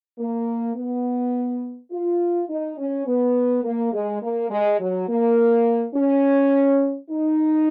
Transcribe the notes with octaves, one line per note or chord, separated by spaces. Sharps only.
A#3
B3
F4
D#4
C#4
B3
A#3
G#3
A#3
G#3
F#3
A#3
C#4
D#4